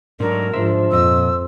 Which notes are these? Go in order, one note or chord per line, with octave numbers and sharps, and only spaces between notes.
G#2 F#3 A3 D4 A#4
G#2 F3 D4 C5 E5
F2 A#2 F3 D#5 E6